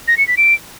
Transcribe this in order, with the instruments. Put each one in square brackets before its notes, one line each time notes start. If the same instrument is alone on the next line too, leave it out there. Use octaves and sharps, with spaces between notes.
[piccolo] A#6
C#7
B6
D7